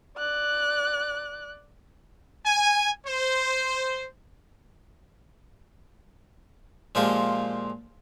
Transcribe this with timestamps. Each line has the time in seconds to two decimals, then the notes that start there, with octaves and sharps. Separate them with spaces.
0.17 D5 F#6
2.46 G#5
3.07 C5
6.95 A#2 F3 G#3 F4 G4